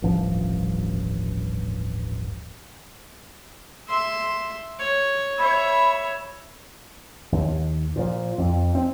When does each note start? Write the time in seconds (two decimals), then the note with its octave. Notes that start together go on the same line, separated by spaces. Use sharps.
0.02 D#1 A1 G2 F3
3.88 E5 C6
4.79 C#5
5.38 C#5 E5 B5
7.32 D#2
7.96 A#2 F3
8.38 F2
8.75 C4